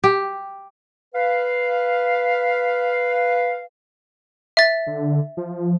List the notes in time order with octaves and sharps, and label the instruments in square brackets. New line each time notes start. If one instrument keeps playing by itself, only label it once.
[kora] G4
[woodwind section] B4 F5
[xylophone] E5 A6
[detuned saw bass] D3
F3